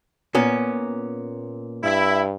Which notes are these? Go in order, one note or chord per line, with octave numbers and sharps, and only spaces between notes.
A#2 B3 C#4
G2 E4